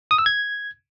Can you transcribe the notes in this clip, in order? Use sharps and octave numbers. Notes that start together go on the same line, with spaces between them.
D#6
E6
G#6